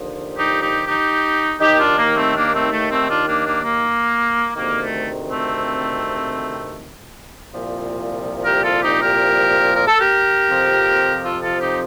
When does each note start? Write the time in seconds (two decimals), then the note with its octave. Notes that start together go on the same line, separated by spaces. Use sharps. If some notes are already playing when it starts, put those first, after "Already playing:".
Already playing: D#2 D3 F3
0.37 D#4 G4
0.61 D#4 G4
0.86 D#4 G4
1.60 D#2 D#3 D#4 G4
1.79 D4 F4
1.98 A#3
2.16 A3 C4
2.34 A#3 D4
2.53 A3 C4
2.71 A3
2.90 A3 C4
3.09 D4 F4
3.27 A#3 D4
3.45 A#3 D4
3.64 A#3
4.56 D2 C3 D#3 A#3
4.82 A3
5.30 A3 C4
7.53 C2 A#2 F3
8.45 G4 A#4
8.63 F4 A4
8.82 D#4 G4
9.01 G4 A#4
9.75 A#4
9.87 A4
9.98 G4 A#4
10.49 F2 C3 F3
11.23 F4 A4
11.41 F4 A4
11.60 D#4 G4